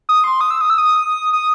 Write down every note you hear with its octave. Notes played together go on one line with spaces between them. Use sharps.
D#6
C6
D#6
E6
D#6
E6
D#6
D#6